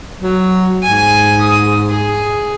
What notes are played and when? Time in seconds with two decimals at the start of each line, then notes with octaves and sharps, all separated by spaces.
0.22 F#3
0.82 G#2 G#5
1.41 D#6
1.89 G#4